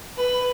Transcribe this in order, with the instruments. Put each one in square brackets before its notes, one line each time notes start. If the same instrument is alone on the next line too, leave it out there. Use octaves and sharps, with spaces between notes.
[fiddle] B4